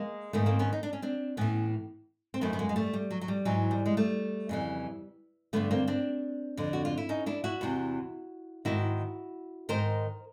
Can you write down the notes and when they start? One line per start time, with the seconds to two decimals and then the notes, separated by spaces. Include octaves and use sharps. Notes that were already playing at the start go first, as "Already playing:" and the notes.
Already playing: G#3 A#3
0.33 G#2 D#3 A3 B3
0.46 A#3 C4
0.59 B3 C#4
0.73 D#4
0.83 D4
0.93 C#4
1.02 C4 D4
1.37 A2 E3 B3 C#4
2.34 C4
2.41 F#2 D#3 A3 B3
2.53 B3
2.59 G#3 A#3
2.69 G#3
2.76 G3 A3
2.93 G3
3.10 F#3
3.21 F#3
3.28 G3
3.45 G#2 E3 F#3
3.71 G3
3.86 G#3
3.97 G3 A3
4.49 F2 C#3 E3
5.53 G2 D3 A3 B3
5.71 A#3 C4
5.87 C4 D4
6.57 F2 D3
6.73 F#4
6.85 F4
6.97 E4
7.09 C#4 D#4
7.26 D4 E4
7.44 E4 F#4
7.61 E2 C3 E3
8.65 G#2 D#3 E4 F#4
9.69 G#2 D#3 A#4 C5